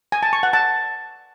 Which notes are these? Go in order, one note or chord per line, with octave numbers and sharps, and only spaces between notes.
G#5
A5
C#6
F#5
A5